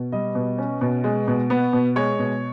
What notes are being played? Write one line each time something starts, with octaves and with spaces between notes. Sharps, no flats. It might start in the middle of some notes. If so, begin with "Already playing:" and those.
Already playing: B2
G3 D#5
B2
C#4
B2
G#3
B2
B3
B2
G#3 C#5
B2